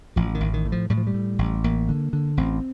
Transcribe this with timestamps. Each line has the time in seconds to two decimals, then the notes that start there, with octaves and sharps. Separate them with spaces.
0.16 A1 F3
0.35 D#3
0.40 A1
0.54 D#3
0.65 A2
0.72 F3
0.90 A2 G3
0.97 F3
1.07 G3
1.14 A2
1.39 A1
1.64 A1 A#3
1.89 D3
2.13 D3
2.37 A1 C4